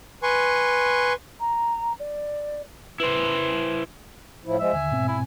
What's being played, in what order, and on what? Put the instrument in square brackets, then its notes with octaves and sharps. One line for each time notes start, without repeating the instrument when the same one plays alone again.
[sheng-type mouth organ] B4 G#5 C6 C#6
[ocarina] A#5
D5
[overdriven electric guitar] E4 C5 [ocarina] B4
[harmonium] A2 F3 E4
[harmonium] F3 G#3 [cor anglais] E5
[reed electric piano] D#2 D3 [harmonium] G#5
[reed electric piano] G#2 B2 C4
[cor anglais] E4